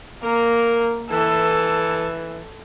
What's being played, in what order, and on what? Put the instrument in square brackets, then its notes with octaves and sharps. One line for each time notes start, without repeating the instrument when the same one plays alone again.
[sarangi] A#3 [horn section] A#4
[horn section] E3 [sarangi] A4